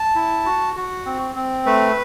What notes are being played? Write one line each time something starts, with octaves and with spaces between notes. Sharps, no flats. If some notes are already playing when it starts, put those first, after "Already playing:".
Already playing: A5
E4
F#4
F#4
C4
C4
A3 B4